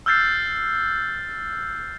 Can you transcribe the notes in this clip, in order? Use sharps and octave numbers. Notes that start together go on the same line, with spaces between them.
E6 F6 G6 A6 C7